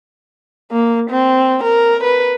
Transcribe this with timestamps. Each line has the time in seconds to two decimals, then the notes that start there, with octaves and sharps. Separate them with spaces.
0.72 A#3
1.10 C4
1.64 A#4
2.04 B4